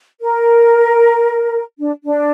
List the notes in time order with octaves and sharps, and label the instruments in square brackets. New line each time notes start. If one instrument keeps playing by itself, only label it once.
[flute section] A#4
D4
D4